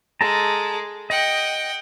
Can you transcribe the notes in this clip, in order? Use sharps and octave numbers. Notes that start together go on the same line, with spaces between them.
G#3 A4 A5 A#5
D#5 F#5 G5